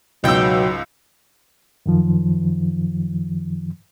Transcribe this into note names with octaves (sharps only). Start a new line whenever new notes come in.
C#2 G#2 B2 F#3 G5 E6
F#2 D#3 F3